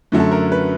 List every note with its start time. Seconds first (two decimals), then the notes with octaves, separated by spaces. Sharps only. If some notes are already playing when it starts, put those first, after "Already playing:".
0.12 F#2 D3 F#3 A3
0.20 A4
0.32 A#4
0.52 B4